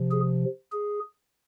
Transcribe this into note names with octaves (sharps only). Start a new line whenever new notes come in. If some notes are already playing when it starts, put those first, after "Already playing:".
Already playing: C3 F3
G#4
G#4